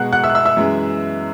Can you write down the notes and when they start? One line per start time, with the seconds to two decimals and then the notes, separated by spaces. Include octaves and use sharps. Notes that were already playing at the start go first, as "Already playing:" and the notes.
Already playing: B2 G#3 B3 F#5 F#6
0.13 F#5 F#6
0.24 E5 E6
0.30 F#6
0.35 E5 E6
0.45 E5 E6
0.57 F#2 E3 G#3